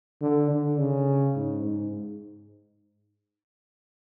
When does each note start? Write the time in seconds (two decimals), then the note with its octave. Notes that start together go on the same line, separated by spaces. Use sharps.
0.21 D3
0.50 D3
0.78 C#3
1.35 G#2
1.64 G#2